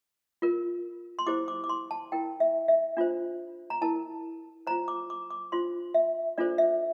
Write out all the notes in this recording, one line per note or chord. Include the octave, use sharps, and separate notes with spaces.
F4 A#4
C6
E4 G4 C5 D6
D6
D6
C6
A5
E4 A#4 G5
E5
E5
D4 F4 C5
A#5
E4 A#4 A5
F4 C5 A#5
D6
D6
D6
D4 F4 C5 C6
E5
D4 F4 A4 C5 D5
E5